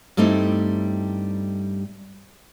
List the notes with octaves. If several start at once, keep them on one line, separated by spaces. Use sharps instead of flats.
G2 G3 A3 C4 D#4 E4